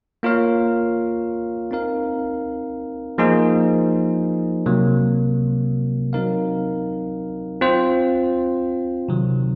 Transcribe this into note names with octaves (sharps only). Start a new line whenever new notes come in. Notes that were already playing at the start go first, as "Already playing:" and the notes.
A#3 F4 A#4 C#5 F5
C4 D#4 A#4 F5
F3 A#3 D#4 G#4 C5
C3 F#3 A#3
F#3 C4 D#4 A#4 F5
C4 F4 C5
C3 D#3 F#3